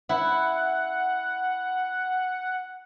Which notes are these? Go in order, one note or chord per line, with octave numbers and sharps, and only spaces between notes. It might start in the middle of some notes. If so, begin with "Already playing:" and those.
E4 F#5